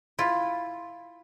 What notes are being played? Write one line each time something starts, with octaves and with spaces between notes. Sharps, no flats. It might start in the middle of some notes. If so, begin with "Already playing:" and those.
E4 F4